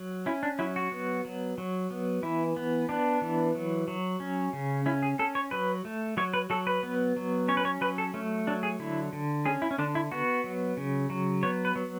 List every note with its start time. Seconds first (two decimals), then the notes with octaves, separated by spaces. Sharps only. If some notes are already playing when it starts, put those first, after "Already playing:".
Already playing: F#3
0.26 C#4 E4
0.43 D4
0.59 F#3 E4
0.76 F#4
0.92 B3
1.25 F#3
1.58 F#3
1.91 B3
2.23 E3 E4
2.57 B3
2.89 B3 D4
3.22 E3
3.55 F#3
3.88 F#3
4.20 C#4
4.53 C#3
4.86 C#4 E4
5.03 G#4
5.19 C#4 A4
5.35 C#5
5.51 F#3 B4
5.85 A3
6.17 F#3 C#5
6.34 B4
6.50 F#3 A4
6.67 B4
6.83 B3
7.16 F#3
7.48 C#4 C#5
7.57 B4
7.65 C#5
7.81 F#3 B4
7.98 A4
8.14 A3 C#4
8.47 F#3 D4
8.63 G#4
8.79 D3 E4
9.13 D3
9.46 C#4 G#4
9.62 E4
9.71 C#4
9.78 D3 D4
9.95 E4
10.12 B3 F#4
10.44 F#3
10.77 C#3
11.10 F#3
11.43 B3 C#5
11.65 B4
11.76 F#3